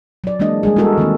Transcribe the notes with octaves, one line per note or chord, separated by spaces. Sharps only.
F#3 D5
E3 G#3 A#3 D4 D#5
G3 G#3 G#4
G#3 B3 E4 F#4 A4 A#4
D#3 E3 A#3 C4